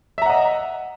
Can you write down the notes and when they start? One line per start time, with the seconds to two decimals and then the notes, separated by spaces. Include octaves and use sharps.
0.18 E5
0.22 A#5
0.26 F#5
0.30 D#5